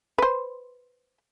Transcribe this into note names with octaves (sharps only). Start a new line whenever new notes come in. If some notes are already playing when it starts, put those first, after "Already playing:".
B4 C5